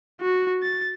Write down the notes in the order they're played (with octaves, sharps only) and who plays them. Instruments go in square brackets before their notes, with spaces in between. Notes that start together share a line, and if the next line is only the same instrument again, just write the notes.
[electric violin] F#4
A6